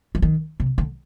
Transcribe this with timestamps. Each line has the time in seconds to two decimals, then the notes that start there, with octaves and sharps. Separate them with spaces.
0.15 F3
0.22 D#3
0.60 C3
0.78 D3